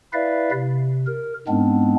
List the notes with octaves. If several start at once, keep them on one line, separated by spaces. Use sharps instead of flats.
E4 B4 D5 E5 F5
C3
A#4
G#2 G#3 B3 C4 D4